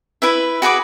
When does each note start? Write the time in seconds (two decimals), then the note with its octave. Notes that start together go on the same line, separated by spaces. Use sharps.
0.22 E4 B4 E5
0.62 F#4 G#4 B4 D6